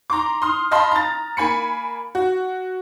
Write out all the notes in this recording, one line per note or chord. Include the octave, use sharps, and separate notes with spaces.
A#5 C6 D6
C6 D#6 F6
D#5 F5 A5 B5 C6
A#5 A6
A#3 G#5 B5 C#7
F#4